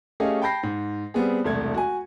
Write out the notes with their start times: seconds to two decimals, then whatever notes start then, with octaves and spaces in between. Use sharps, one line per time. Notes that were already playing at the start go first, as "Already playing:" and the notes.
0.20 A3 C#4 G4 G#4 D#5 F5
0.42 G5 A5 B5 G6 A#6 C7
0.63 G#2
1.14 G3 B3 C4 G#4
1.44 E1 C2 A3 G#6
1.74 F#4 G#5